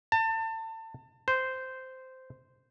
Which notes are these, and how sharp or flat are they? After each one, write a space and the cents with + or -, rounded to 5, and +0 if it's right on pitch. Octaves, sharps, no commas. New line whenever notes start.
A5 +30
C5 -10